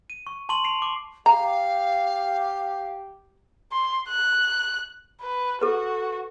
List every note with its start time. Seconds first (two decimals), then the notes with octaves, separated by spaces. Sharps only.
0.10 D#7
0.27 C#6
0.49 A5 C6 C#6 D#7 F#7
0.64 C7 D7 F7
0.82 D6
1.26 G4 F5 A#5
3.72 C6
4.09 F#6
5.22 B4
5.61 F#4 A4 B4